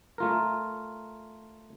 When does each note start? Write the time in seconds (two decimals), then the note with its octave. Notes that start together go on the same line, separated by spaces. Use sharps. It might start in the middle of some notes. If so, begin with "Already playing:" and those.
0.18 A3 F4 A#4